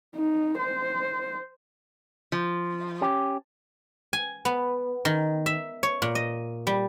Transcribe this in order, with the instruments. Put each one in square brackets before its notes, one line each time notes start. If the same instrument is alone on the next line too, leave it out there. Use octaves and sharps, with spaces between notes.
[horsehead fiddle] D#4
C5
[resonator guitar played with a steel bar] F3
[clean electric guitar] C#4 G4
[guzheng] G#5
B3
D#3
E5
C#5
A#2
D#5
G3